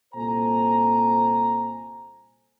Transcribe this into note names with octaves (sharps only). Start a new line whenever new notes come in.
C2 A#2 A4 C5 G#5 A#5